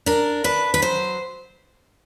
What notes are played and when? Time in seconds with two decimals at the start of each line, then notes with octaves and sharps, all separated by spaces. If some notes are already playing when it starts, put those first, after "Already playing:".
0.06 D4 A#4
0.44 D4 B4
0.74 B4
0.82 F#3 C5